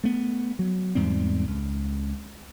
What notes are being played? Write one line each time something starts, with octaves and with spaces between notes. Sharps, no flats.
A3 B3
F#3
E2 G#2 G3 C4
C#2